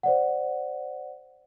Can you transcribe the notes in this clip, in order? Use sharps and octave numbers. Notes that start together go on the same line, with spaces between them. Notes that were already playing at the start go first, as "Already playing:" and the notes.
C5 D5 F#5